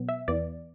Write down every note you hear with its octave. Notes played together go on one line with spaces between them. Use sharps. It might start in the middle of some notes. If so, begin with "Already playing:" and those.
Already playing: B2 F#3 B3
E5
E2 E3 B3 D5